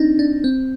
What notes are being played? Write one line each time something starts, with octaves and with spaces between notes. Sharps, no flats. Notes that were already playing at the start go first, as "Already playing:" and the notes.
Already playing: C4 D4 D#4
D4
C4